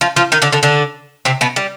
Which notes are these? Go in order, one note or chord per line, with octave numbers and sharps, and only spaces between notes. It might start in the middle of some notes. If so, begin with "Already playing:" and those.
F3 F4
F3 F4
D#3 D#4
D3 D4
D3 D4
D3 D4
C3 C4
B2 B3
G3